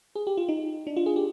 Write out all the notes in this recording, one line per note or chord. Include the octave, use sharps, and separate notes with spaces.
G#4
G4
F4
D#4
D4
F4
G#4
G4